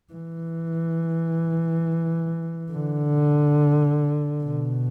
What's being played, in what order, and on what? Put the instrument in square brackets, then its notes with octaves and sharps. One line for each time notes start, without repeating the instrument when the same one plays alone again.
[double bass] E3
D3
B2